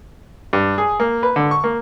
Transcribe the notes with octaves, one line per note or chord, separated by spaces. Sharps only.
G2
G#4
A#3
B4
D3
C#6
A#3